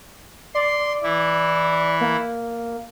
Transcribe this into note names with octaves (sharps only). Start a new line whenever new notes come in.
D5 C6
E3 E4
A#3